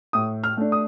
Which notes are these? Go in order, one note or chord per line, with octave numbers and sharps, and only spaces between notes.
A2 D#6
F6
A3 D4
D#6